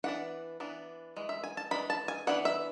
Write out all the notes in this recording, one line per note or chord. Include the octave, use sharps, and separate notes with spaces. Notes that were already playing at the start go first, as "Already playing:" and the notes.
E3 B3 D4 F#5
E3 B3 D4
E3 G#3
E5
G#5
A5
E3 G#3 D4 B5
A5
G#5
E3 B3 D4 F#5
E5